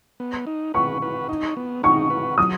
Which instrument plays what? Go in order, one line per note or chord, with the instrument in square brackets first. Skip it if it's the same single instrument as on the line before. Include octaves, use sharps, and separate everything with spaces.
[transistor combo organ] B3
D#4
[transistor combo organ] B4 [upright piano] C#6
[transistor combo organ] B4
D#4
B3
[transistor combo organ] D#4 [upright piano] C#6
[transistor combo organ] B4
[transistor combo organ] F#3 [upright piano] D#6